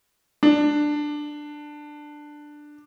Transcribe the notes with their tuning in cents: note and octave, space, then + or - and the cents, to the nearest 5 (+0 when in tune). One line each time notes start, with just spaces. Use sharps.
D4 +10